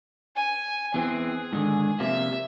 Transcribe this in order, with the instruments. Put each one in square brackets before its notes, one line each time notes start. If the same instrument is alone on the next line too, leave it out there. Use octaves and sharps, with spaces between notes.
[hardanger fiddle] G#5
[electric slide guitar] E2 E3 C4 [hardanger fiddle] G#4
[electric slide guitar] G#2 D3 D#3
[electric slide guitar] C3 F3 A#3 [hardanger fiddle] E5